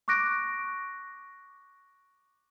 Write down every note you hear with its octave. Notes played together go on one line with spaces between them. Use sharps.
C#6 D6 F#6 A#6 D7